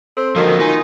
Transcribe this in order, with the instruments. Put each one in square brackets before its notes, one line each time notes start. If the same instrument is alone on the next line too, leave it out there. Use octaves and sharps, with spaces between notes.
[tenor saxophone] C4 [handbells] A4
[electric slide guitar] D3 F3 [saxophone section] D#3 [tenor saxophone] A#3 [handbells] F#4
[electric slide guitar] D#4 [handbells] F4 G#5